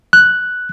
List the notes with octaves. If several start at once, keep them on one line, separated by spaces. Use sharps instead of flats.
F#6